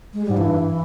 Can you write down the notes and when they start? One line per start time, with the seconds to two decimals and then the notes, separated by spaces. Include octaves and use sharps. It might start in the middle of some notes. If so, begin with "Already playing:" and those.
0.14 G#3
0.25 G#2 G3
0.37 G2 E3